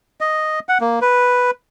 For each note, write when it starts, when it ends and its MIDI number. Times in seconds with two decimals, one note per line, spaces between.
0.21 0.60 75
0.69 0.78 78
0.81 0.99 58
1.01 1.51 71